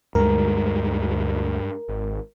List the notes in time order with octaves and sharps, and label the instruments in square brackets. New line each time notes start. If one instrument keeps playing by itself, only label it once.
[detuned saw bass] D2 [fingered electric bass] G2 G#3 [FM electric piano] A#4
[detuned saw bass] G#1